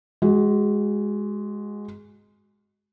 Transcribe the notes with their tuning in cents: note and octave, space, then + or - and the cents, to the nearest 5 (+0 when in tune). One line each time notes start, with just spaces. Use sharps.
G#3 +0 F#4 +20